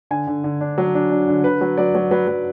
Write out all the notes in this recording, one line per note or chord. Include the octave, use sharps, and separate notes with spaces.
D3 G#5
D3
D3
D4
F#3
D4
D4
D3
D3 B4
F#3
F#3 D5
F#3
F#3 B4
F#3